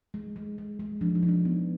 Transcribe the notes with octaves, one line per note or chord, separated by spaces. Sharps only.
G#3
G#3
G#3
G#3
F3 D4
D#4
F3
D4
B3